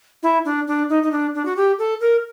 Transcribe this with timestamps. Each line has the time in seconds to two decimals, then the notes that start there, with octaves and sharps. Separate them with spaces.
0.23 E4
0.45 D4
0.67 D4
0.89 D#4
1.03 D#4
1.11 D4
1.35 D4
1.45 F#4
1.56 G4
1.79 A4
2.01 A#4